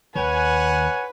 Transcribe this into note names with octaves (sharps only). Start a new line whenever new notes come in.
D#2 B4 C#5 F#5 G#5